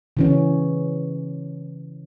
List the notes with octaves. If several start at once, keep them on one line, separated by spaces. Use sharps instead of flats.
C#3 E3 C#4